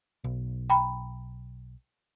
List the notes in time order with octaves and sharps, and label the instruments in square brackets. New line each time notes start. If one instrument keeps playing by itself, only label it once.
[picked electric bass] B1
[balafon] G5 A#5 B5